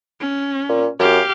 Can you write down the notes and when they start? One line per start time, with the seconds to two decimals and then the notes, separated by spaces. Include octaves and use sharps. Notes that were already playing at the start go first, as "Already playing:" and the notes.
0.20 C#4
0.69 A#2
0.99 F#2 G4 F5